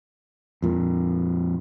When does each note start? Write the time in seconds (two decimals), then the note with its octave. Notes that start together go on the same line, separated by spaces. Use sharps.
0.62 F2 A#2